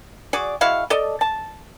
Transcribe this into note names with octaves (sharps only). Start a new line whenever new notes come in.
F#4 G#4 D5
G#3 E4 F#4 F5
A4 D5 D#5
A5